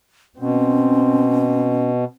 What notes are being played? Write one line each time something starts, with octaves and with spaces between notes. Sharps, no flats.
B2 C4 C#4